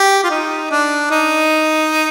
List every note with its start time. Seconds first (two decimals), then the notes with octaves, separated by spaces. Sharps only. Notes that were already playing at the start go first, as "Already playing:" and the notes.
Already playing: G4
0.24 F4
0.30 D#4
0.71 D4
1.11 D#4